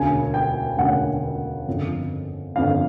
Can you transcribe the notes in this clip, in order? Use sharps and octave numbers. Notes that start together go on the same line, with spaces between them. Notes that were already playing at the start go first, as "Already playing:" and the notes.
Already playing: E1 D2 C#3 G#5
G5
E1 D2 C#3 F#5
G1 F2 C#3
G1 F2 C#3 F5